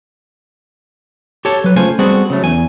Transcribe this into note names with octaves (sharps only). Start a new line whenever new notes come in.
G4 A4 C#5 A5
F#3 B4
C#2 A3 F4 C5 G#5
G3 B3 C4 F#4 G#4 A4
C#3 F#3 A3
E2 G#5